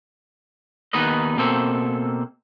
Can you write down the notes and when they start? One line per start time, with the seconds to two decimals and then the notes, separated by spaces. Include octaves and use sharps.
0.93 D#2 B3 D#4 B4 D#5
1.37 B2 A#3 C4 A4